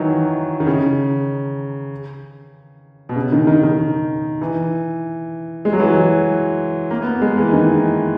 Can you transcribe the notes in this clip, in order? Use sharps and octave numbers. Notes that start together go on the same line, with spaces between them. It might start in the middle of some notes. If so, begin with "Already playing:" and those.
Already playing: D#3 E3 F#3
D#3
C#3
B2
C#3
D#3
D#3
D#3
E3
G#3
F#3
E3
F#3
A#3
B3
A#3
G#3
E3
D#3